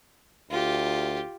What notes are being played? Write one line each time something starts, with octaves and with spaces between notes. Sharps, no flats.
D2 F4 G4